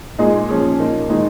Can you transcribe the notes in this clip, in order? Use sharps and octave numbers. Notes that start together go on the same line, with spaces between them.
A#2 G#3 D#4 G#4
F3 C#4 G#4
A#2 A#3 D#4
D#3 G#3 D#4